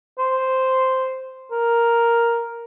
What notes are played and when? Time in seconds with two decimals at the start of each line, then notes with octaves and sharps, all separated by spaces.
0.18 C5
1.51 A#4